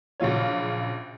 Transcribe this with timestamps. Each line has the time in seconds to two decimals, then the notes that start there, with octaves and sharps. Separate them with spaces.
0.20 A#1 C#3 F#3 F4 C#5